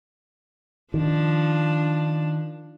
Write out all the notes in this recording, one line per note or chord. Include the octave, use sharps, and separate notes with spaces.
D#3 F3 D4